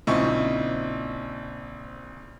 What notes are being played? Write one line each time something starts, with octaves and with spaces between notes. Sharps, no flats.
A#1 C#3 C4 D#4 E4 C#6